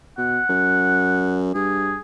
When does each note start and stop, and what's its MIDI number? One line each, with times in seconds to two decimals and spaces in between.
0.18 0.39 47
0.18 1.47 78
0.49 1.52 42
1.55 1.96 43
1.55 2.00 68